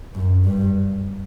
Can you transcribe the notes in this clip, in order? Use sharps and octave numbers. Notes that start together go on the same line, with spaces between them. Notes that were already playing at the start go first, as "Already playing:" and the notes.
F#2
G2